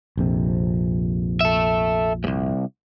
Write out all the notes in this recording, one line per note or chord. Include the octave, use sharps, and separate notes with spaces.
A#1 F2 C3
A4 E5
C2 G#2